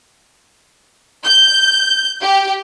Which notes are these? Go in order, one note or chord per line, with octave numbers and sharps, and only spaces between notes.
G6
G4